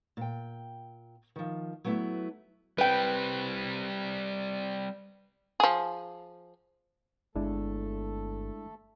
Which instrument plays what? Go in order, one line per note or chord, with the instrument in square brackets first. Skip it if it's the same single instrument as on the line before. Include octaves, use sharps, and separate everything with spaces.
[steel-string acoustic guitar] A#2 G5
D#3 F3
F#3 A3 B3 E4 E5
[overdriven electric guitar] G3 C4 [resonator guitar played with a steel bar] B4 G5
[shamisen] F3 G#4
[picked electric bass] G1 [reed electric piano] G#3 D4 E4 [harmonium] A3 A4